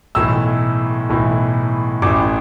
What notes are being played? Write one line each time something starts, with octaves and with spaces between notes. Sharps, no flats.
B1 A2 E3 E6
B1 A2 E3
A1 A2 E3 D6